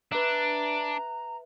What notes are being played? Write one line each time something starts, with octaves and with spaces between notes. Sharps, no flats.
D4 B4 E5 A#5